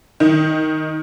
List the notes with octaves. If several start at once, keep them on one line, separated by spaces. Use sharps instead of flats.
D#3